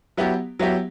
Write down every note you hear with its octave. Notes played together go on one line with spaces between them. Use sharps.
F#3 B3 E4 G4
F#3 B3 E4 G4